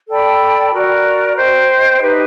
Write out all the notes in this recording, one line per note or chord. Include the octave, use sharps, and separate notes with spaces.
A4 D5 G5 B5
F#4 A#4 D5
C5 D#5 G5
D#4 G4 B4 E5